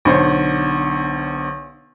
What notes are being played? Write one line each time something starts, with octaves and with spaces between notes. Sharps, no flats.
B1 D3 C5 C#5